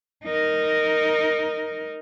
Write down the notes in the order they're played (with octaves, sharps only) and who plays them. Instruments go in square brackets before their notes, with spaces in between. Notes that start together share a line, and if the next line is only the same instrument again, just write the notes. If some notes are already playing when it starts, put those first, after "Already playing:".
[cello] D#4 A#4